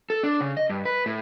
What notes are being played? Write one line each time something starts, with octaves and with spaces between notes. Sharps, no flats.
A4
D4
C#3
D#5
G2
B4
A2